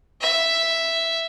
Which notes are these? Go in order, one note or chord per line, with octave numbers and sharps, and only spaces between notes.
E5